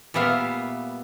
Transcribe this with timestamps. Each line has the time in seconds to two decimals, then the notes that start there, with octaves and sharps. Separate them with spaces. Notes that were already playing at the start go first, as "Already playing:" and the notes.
0.14 A#2 G3 B3 E5 F5